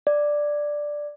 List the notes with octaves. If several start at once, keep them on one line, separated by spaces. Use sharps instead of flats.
D5